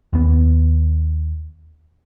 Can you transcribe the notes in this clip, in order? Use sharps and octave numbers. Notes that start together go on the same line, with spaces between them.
D#2 B3